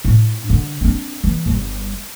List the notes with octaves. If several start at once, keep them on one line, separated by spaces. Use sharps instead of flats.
A2
D3
C4 D4
E3
G1 G3